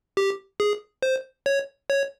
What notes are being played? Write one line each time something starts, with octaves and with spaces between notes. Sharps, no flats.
G4
G#4
C5
C#5
C#5